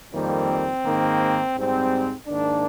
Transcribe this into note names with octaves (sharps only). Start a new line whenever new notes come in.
F2 D#3 G3 A#3 C4
G#2 D#3 A#3
G#2 G3 C4
G#2 D#3 A#3 D4